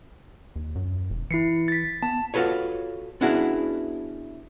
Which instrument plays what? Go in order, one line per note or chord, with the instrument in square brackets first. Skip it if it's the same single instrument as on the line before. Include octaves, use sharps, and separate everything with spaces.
[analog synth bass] D#2
F#2
E1
[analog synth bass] E3 [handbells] E4 C7 C#7
[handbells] A6 B6
[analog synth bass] B3 [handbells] A5
[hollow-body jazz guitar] F4 F#4 A4 B4 C#5
B3 C#4 D4 E4 F#4 G#4